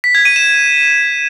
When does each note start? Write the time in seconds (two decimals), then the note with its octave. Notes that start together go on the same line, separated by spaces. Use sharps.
0.04 B6
0.15 G#6
0.25 D#7
0.36 E7